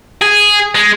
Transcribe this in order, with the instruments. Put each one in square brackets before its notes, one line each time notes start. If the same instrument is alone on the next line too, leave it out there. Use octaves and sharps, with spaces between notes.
[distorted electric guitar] G#4
G#3